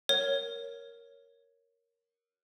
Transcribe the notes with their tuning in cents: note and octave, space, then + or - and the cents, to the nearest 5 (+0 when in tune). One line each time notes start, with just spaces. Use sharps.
A#4 +0 C#5 +0